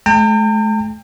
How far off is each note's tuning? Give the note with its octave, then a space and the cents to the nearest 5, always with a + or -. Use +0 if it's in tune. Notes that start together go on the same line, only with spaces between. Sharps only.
A3 -45 G5 +30 A#5 -45